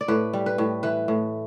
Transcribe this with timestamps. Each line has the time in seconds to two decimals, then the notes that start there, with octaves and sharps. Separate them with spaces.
0.01 D5
0.08 A2 B4
0.33 G3
0.46 B4
0.58 A2
0.83 E3 B4
1.08 A2